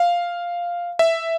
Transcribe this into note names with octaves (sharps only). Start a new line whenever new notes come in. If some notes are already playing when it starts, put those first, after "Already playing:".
Already playing: F5
E5